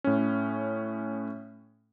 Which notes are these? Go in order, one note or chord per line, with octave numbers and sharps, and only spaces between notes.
A2 C#4